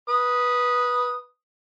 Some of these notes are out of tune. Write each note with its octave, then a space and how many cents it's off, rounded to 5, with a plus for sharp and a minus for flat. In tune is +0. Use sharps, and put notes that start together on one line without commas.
B4 -15 D#6 +0